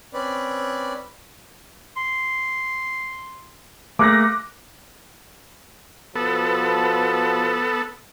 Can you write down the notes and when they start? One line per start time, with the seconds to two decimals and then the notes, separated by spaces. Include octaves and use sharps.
0.13 C4 C#4 B4 D5
1.97 C6
3.99 A3 A#3 G#4 D6 F#6 A#6
6.15 B2 F3 B3 A4 B4